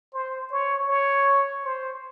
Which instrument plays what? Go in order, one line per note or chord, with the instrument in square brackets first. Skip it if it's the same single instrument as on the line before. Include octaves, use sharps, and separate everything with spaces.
[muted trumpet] C5
C#5
C#5
C5